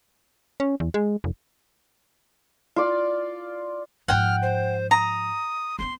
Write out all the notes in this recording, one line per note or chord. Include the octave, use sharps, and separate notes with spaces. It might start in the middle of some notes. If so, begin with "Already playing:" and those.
C#4
E2
G#3
F1
F4 D5
G#2 F3 F#5 G5 F6
C5
A#5 D#6
A#3 B3 C6